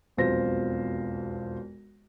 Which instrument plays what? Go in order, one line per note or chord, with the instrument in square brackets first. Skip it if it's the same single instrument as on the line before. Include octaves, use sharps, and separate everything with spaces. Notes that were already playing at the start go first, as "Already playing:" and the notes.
[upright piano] E1 B1 F2 F4 C5 A#6